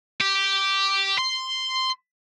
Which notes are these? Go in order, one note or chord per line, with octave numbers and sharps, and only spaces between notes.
G4
C6